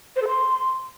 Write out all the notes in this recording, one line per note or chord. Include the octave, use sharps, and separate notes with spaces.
C5
A4
C6